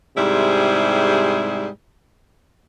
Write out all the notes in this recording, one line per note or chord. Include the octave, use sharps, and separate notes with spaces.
G#2 C3 G3 E4 G#4